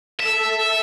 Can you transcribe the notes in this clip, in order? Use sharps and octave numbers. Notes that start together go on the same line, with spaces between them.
A4 E5